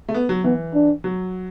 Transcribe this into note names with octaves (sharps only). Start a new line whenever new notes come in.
A3
B3
F#3
E3 B3
D4
F#3